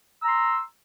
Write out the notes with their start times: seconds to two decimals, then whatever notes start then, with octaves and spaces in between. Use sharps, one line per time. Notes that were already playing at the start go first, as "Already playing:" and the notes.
0.21 E6
0.24 A#5
0.28 C6